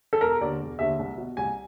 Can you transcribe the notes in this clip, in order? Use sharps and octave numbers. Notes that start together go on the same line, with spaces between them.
A4
E1 A#4
D#2 D3 D5
E1
D#2 D3 E5
C2
B2
C2 G#5